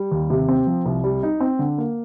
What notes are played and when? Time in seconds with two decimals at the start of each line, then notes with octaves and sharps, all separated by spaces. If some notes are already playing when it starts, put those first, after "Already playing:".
Already playing: G3
0.12 D#2
0.30 C3
0.49 C4
0.67 F3
0.86 C2
1.04 G3
1.23 D#4
1.41 C4
1.59 D3
1.78 A#3